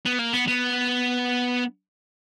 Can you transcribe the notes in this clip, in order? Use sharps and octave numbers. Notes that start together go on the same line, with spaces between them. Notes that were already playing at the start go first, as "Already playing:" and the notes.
B3
A#3
B3
B3